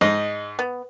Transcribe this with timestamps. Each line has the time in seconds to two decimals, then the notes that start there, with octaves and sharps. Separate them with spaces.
0.01 G#2 D#4 D#5
0.59 B3